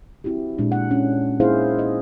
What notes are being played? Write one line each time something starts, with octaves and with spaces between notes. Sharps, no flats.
C4 E4 F#4 G4
A#2 G#3 D4
F#5
C#4 D4
A#3 D#4 E4 G#4 C5 F5
D#5